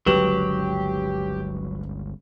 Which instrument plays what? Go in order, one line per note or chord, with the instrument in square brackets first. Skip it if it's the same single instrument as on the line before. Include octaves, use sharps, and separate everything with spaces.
[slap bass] G1 C#2 [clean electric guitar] F#3 [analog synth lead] G4 [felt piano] B4 E7